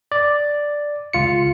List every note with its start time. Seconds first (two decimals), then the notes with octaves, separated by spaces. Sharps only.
0.12 D5
1.13 C#2 F4 C#7